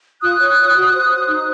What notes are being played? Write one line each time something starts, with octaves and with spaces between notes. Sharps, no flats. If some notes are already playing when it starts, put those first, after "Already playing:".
F4 D#6 F#6
C#5
C#5
F#4
C5
C5
D#4